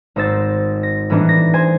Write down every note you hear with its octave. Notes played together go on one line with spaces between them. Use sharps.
G#1 D#4 C5 E6 A6
A#6
A2 E3 G3 B3 D4 D#4
A#6
C5 G#5 C6